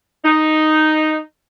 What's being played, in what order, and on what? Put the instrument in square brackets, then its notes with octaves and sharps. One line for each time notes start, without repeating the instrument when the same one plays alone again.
[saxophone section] D#4